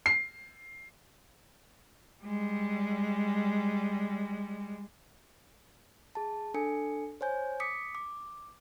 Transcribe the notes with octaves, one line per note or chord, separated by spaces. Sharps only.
C7
G3 G#3
G#4 A5
D4 A4 G#5 C#7
C5 C#5 G#5 G6
D6 D#6 B6 C#7
D6